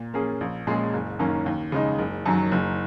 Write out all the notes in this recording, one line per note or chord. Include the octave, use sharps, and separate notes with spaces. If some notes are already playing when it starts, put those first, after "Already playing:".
Already playing: A#2
A#3 C#4 G#4
A#1
A#2 G#3 C#4 G#4
F#1
F#2 D#3 A#3 C#4
D#2
C#3 G#3 D#4
F#1
F#2 D#3 F#3
F#1